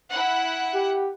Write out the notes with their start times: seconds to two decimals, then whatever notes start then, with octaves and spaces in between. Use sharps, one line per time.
0.11 E4 F#5
0.74 G4